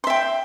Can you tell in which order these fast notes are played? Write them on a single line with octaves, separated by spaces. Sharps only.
C6 E5 G5